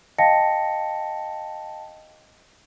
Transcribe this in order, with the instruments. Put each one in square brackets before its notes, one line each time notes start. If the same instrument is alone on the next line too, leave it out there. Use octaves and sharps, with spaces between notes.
[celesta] D#5 F5 G5 A5 A#6 C#7